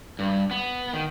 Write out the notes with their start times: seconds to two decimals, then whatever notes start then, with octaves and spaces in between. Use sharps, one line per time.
0.19 G2
0.51 B3
0.93 D#3